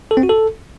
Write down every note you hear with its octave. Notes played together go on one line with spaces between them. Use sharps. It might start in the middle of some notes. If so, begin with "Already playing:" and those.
A4
C4
F#4
A4